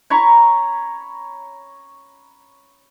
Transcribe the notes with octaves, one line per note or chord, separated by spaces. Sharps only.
C#5 A#5 B5 C#6